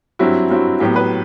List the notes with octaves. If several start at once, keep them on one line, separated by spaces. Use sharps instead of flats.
G2 F#3 C4 E4 F#4
G2 F#3 C4 E4
A2 F#3 B3 G4
B4